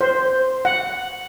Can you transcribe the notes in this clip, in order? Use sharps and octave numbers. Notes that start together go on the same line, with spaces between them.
C5
F#5